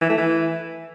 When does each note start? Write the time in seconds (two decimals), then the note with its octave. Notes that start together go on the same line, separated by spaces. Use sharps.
0.02 E3
0.10 A3
0.18 E3